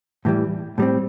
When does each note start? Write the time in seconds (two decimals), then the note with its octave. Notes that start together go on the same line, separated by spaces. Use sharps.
0.25 A2 E3 G3
0.78 A2 G3 C4